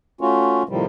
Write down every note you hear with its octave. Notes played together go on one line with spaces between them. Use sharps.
A3 C#4 F4 F#4
A2 C3 D#3 F3 G3